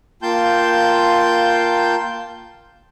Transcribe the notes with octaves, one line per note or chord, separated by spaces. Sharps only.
A#3 F4 G5 A5 C6 G6